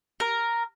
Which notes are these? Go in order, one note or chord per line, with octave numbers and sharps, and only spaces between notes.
A#4